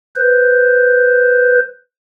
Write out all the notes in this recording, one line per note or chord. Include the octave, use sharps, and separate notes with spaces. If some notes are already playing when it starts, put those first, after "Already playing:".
B4 C5